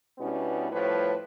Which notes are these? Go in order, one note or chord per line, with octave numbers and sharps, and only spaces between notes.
B2 G3 B3 C#4 D4 E4
A2 F3 G3 B4 C#5